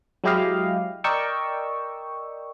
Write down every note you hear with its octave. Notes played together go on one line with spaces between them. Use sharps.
F#3 G#3 E4 G4 D#5 F5
A#4 D5 D#5 G5 C#6 E6